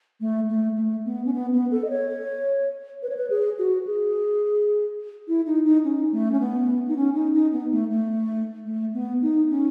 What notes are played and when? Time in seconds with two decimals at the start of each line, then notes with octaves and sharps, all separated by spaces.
0.21 A3
0.49 A3
0.77 A3
1.05 B3
1.26 C#4
1.33 B3
1.52 B3
1.71 A4
1.84 D#5
1.90 C#5
3.03 B4
3.09 C#5
3.17 B4
3.30 G#4
3.59 F#4
3.87 G#4
5.28 E4
5.46 D#4
5.65 D#4
5.84 C#4
6.12 A3
6.32 C#4
6.40 B3
6.88 D#4
6.96 C#4
7.15 D#4
7.34 D#4
7.53 B3
7.71 A3
7.90 A3
8.66 A3
8.94 B3
9.22 D#4
9.50 C#4